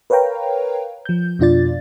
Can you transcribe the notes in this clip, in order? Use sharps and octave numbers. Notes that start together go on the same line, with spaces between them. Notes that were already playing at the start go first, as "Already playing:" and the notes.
A#4 B4 C#5 F5 G5 A#5
F3 G6
F2 B2 D4 F4 D5 A6